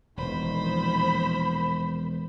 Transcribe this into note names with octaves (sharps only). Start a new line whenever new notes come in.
E1 A#2 D#3 F3 C5 B5